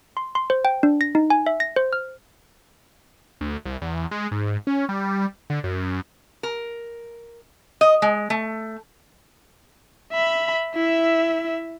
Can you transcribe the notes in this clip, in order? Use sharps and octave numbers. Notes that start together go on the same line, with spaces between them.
C6
C6
C5
G5
D4
A#6
D#4
G#5
E5
A#6
C5
F6
D2
C2
E2
G#3
G#2
C#4
G3
D3
F#2
A#4
D#5
G#3
A3
E5 B5
E4 E5